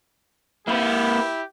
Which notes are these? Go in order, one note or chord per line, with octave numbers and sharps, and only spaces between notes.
A#3 E4 G4 B4